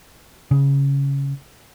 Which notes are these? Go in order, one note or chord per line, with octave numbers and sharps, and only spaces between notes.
C#3